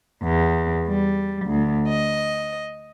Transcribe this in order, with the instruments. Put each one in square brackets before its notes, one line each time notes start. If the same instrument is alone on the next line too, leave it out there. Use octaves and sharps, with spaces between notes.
[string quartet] E2
G3
D2
D#5